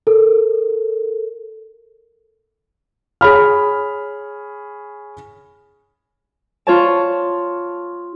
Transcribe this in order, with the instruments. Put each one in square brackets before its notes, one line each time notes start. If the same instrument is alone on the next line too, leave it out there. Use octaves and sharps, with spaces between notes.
[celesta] A4 A#4
[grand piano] G#4 C#5 B5 F6
[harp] F4 C#5 A5